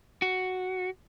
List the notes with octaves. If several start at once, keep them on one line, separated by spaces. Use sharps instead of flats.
F#4